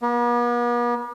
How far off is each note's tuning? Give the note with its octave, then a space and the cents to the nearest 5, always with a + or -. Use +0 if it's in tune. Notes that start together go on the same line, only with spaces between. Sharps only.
B3 -45